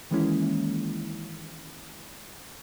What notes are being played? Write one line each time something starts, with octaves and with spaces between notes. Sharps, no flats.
D#3 E3 G#3 A#3 C#4 E4